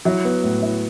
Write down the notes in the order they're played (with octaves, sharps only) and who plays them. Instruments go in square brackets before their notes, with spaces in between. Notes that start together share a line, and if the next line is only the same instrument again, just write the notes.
[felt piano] F#3 [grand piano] E4
[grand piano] B3
A2
E4